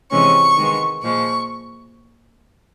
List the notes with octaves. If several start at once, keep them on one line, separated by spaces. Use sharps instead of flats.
C3 E3 G#3 C#4 C#6
D#3 G#3 B3
A#2 F3 G#3 C#6